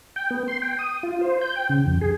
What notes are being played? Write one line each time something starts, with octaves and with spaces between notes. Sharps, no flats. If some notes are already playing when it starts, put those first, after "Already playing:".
G5
B3
C6
G5
D#6
F4
C5
G6
G5
C#3
F2
G#4